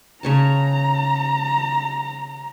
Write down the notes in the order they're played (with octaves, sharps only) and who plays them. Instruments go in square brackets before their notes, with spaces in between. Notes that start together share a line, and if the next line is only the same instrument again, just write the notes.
[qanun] C#3 C#5 A5 [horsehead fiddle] A#5